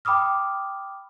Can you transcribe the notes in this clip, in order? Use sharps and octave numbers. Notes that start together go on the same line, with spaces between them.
G5 B5 D6 D#6 F6